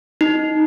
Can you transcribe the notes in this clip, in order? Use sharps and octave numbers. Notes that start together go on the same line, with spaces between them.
D#4